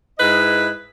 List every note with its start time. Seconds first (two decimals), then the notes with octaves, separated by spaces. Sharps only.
0.19 G#2 E4 B4 D#5